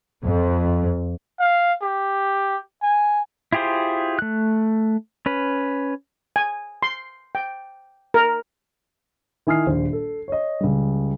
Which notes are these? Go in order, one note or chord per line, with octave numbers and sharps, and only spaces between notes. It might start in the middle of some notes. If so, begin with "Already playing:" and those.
F2
F5
G4
G#5
E4 F4 G4 G#4 C5
A3 F#6
C#4 B4
G#5
C6
G5
A#4
D#3 E4 G#5 D#6 F6 C7
D#1 A#1 C5
A4
C#5 D#5
C#2 G3